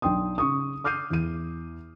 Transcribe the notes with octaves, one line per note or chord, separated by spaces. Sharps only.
B1 D4 G5 C6 D#6
C#3 C#6 D#6
D6 F6 G6 C7 D#7
E2 D#7